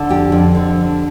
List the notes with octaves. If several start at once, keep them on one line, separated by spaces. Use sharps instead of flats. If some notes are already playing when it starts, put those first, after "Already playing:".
Already playing: D3
F2 G4
F2
D3